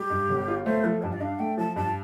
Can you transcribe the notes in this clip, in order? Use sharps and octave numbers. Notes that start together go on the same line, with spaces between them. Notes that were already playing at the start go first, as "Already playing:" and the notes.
Already playing: G3 G4
G2
G1
F4
A3 C5
F3 A4
G2 A5
D5
D4 F5
A3 G5
F3 A5
G2 A5